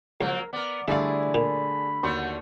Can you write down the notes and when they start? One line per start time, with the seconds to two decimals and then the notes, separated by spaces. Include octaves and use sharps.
0.21 C#2 F3 F#3 A#3 A#4
0.53 B3 A#4 D5
0.88 D3 G3 A3 E4 G#4 D5 E5 F5
1.34 A#2 B5
2.03 D#2 D3 A3 F#4 C6